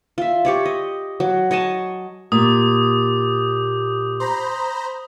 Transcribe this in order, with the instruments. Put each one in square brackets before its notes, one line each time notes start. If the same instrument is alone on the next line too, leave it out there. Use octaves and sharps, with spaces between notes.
[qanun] F4 E5
G4 C#5 D5
D#5
F#3
C#5 D#5 G#5 A5
[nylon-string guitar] A#2 [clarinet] G4 [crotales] D#6
[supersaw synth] C5 A#5 B5